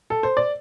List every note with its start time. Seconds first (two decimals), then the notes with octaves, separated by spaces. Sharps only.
0.10 A4
0.23 C5
0.37 D5